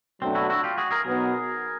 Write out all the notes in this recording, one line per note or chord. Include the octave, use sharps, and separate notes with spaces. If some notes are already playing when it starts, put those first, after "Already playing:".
B2 F#3 A3 C4 D4
E4 F#4
E4 F#4
F4 G4
F#4 G#4
G#4 A#4
B2 F#3 B3 D#4 F#4 G#4 A#4